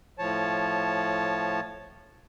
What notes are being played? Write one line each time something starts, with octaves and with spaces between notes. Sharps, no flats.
A2 F3 C#5 A5